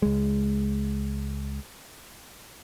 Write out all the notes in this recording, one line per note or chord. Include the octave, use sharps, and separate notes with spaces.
C#2 G#3